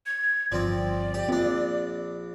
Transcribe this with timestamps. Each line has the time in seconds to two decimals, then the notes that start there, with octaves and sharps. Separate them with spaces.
0.06 G#6
0.52 G1 F3 C4 D5
1.14 G4
1.28 A#1 C4 D4